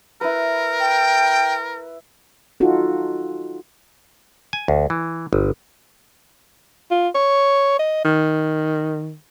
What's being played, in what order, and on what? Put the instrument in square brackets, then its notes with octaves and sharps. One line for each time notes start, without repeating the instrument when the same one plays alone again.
[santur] E4 B4 [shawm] A#4
[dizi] G5
[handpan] D#4 F4 F#4 A4
[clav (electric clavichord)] G#5
D2
E3
G1
[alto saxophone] F4
C#5
D#5
D#3